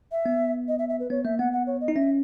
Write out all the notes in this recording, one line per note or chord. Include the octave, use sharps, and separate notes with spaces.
E5
B3
D#5
E5
E5
B4
B3 C#5
A#3 E5
B3 F#5
F#5
C#5
D#5
D#4
C#4 E5